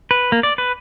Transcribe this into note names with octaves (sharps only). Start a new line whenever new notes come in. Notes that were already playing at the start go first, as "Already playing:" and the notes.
B4
A#3
D5
B4